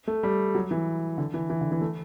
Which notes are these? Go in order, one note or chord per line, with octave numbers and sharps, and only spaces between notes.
A3
G3
F#3
E3
D3
E3
E3
D3
E3
A3